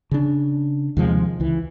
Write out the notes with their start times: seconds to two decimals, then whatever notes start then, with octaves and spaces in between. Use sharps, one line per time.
0.11 C#3 D4
0.97 D#2 C3 F3 G#3
1.40 C#2 E3